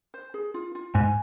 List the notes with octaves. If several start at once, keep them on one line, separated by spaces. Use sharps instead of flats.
C5
G#4
F4
F4
G#2 G#5